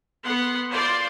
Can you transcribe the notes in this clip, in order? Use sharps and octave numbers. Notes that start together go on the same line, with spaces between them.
B3 F#5 C6
F4 C5 D5 C6